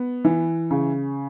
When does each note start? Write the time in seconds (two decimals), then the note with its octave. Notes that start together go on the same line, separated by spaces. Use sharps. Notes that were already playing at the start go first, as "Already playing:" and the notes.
Already playing: B3
0.25 E3
0.71 C#3